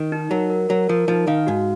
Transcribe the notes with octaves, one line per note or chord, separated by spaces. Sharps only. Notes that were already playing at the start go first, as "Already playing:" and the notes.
Already playing: D#3
D#4
F#3 A#4
A#4
F#3 A#4
F3 A#4
F3 D#4
D#3 F5
G#2 F#4